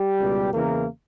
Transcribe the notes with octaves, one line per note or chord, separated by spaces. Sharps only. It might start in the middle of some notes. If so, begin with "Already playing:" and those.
Already playing: G3 G4
C#2 B2
E2 C#3 E3 A#3 A#4